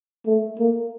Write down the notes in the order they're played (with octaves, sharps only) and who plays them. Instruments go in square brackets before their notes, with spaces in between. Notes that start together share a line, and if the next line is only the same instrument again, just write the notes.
[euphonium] A3
A#3